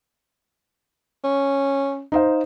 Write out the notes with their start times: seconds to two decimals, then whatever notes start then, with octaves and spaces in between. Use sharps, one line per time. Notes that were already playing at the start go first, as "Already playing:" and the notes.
1.24 C#4
2.12 D#4 C5 F5